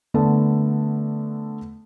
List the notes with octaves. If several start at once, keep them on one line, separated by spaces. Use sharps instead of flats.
D3 A3 B3 A5